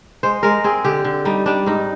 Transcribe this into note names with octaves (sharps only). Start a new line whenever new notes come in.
G#3 C5
G#3 A#4
C4 G#4
D3 G4
D3
G3 D#4
G3 D4
G#2 D#4